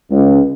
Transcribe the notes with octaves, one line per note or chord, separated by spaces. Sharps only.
C#2